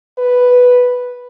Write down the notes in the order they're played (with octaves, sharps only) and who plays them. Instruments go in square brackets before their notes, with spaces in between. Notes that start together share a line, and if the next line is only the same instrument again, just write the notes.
[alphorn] B4